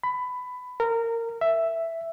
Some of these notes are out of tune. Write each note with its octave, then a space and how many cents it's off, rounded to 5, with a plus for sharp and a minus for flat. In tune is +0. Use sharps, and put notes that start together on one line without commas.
B5 +15
A#4 -20
E5 +5